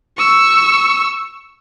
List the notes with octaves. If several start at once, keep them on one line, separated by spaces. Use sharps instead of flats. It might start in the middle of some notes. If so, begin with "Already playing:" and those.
C#6 E6